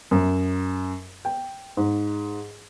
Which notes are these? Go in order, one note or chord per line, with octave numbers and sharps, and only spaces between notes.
F#2
G5
G#2